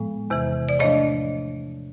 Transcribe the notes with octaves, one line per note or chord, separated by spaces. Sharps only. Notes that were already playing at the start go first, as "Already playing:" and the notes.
Already playing: A2 F3 G#3 B3
E2 C3 E3
D5
A2 F3 A3 D4 C#5 D#5